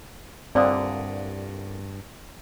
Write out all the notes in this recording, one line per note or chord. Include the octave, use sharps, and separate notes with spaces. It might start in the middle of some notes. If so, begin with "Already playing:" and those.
C2 G2 A#2 D3 C4 D5 F5 D#6